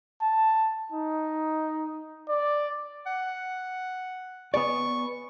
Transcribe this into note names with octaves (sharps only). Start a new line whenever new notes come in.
A5
D#4
D5
F#5
B3 G#4 D5 C#6